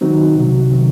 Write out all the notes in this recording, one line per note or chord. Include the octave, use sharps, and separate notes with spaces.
D#3 F#3 C4 D#4 F#4
C2 C3 F#3
C3 D#3 F#3